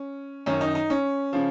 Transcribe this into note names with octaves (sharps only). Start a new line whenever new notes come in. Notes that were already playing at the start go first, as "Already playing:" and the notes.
Already playing: C#4
F#2 D#3 C#4
D#4
D#4
C#4
C#3 F3